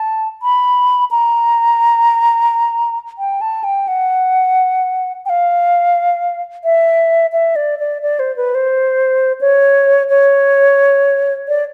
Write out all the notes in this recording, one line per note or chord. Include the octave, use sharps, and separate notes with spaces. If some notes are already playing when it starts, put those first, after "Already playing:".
Already playing: A5
B5
A#5
G5
A5
G5
F#5
G5
F5
E5
E5
D5
D5
D5
C5
B4
C5
C#5
C#5
D5